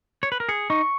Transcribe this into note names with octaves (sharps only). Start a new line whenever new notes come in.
C#5
B4
A#4
G#4 C#7
D#4 C#6